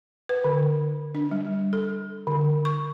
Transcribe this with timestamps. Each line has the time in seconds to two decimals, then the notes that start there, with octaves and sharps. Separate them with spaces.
0.29 B4
0.44 D3
1.15 D4
1.31 G3
1.73 A4
2.27 D3
2.65 C#6